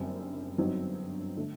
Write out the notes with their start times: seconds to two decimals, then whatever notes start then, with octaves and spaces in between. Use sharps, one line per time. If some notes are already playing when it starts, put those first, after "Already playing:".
Already playing: F#1 F#2 D3 G3 C4
0.58 G1 G2 F#3 C4 D#4
1.37 D3 A3